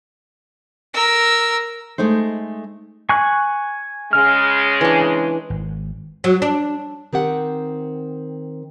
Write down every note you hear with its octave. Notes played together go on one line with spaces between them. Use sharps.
A#4 E6
G#3 A3 D#4 C5
G#5 C#6 F#6
C#3 G#3 F6
E3 D4
G#1
F#3
D4
D#3 C4 G4 F#5